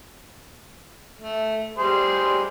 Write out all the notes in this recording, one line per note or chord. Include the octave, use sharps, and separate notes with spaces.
A3
G3 G#4 C5